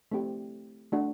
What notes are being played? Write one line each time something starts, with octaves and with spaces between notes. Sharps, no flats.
A3 C4 G4
A3 D4 F#4